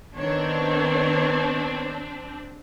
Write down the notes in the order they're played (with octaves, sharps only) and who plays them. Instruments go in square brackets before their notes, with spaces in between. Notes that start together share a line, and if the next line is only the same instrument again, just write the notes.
[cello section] D#3 C#5 [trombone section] B3 [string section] C4 D4